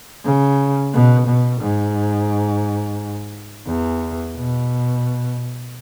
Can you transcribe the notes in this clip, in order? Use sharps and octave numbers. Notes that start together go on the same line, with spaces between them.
C#3
B2
B2
G#2
E2
B2